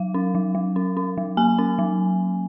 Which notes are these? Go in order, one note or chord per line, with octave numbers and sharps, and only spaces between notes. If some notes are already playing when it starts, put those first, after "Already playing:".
Already playing: F#3 F5
C#4
F#3
F#3
C#4
C#4
F#3
A#3 G#5
C#4
F#3